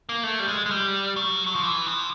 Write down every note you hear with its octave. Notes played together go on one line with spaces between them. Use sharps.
A#3
A3
G3
G#3
G#3
G3
F#3
F#3
F3
E3
F3